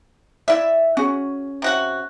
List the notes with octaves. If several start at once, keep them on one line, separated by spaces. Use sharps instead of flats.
E4 D5 E5
C#4 F#4 G#4
C3 F#4 F#5